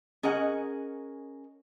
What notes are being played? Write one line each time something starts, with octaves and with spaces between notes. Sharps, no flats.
C#4 G#4 A#4 D#5 F#5